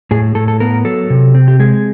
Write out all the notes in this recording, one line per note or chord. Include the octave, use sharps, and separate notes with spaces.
A2 G#4
A2 A4
A4
B3 A#4
F#3 A4
C3
C4
G4
G#3 G#4